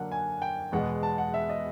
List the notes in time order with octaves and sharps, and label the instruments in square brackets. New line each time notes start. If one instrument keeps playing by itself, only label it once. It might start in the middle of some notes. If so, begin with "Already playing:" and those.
Already playing: [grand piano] D3 F#3 A#3 D4 F#5
G#5
G5
E2 B2 G#3 F#5
A5
F#5
E5
D#5